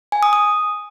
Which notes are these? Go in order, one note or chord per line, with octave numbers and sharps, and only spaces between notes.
G#5
D#6
D#6